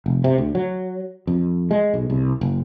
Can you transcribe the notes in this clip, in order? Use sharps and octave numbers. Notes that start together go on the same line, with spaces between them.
F1
C3
D2
F#3
F2
G#3
B1
C2
F#1